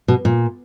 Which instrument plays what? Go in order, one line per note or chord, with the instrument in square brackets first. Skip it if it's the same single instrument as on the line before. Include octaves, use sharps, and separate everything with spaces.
[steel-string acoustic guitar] B2
A#2